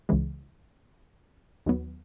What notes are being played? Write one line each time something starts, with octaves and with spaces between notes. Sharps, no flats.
C#2 C#3 E3 G#3
D#2 D#3 F#3 B3